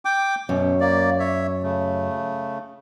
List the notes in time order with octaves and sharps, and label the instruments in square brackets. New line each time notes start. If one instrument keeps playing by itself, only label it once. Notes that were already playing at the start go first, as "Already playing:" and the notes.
[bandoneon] G5 D6
[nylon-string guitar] F#2 [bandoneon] B2
[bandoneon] A#3 D5
C#5 E5
C#3 A3